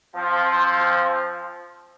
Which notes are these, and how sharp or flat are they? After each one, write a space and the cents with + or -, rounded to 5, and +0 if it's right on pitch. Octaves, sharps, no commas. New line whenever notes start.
F3 +0 C4 +25